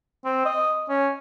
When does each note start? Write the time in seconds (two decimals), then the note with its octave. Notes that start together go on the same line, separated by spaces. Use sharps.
0.25 C4
0.45 D#5
0.89 C#4